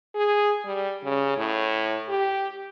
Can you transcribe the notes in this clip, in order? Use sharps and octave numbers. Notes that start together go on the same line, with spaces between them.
G#4
G3
C#3
A2
G4